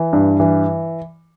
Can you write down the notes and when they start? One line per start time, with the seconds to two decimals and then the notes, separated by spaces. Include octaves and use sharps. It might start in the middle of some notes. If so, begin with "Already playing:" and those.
Already playing: E3
0.13 G2
0.40 E3